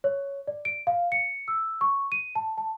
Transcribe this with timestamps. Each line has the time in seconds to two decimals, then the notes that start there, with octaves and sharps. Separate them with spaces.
0.04 C#5
0.48 D5
0.65 D7
0.87 F5
1.12 C#7
1.48 E6
1.81 C#6
2.12 D#7
2.35 A5
2.58 A5